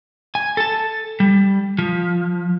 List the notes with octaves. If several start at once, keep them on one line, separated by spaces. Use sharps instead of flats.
G#5
A4 A5
G3
F3